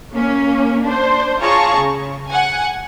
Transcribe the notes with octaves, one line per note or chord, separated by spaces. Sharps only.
A#3 C#4
D4 C5
F4 G#4 C#5 A5 A#5 C#6
C#3
F#5 G#5